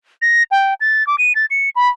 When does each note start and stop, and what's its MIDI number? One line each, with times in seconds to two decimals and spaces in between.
0.22 0.43 94
0.51 0.74 79
0.81 1.06 93
1.07 1.16 86
1.18 1.35 99
1.35 1.46 93
1.51 1.70 97
1.76 1.89 83